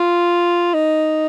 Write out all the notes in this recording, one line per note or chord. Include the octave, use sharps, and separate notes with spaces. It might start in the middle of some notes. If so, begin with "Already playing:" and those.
Already playing: F4
D#4